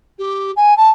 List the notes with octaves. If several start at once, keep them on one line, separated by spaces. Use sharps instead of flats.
G4
G#5
A5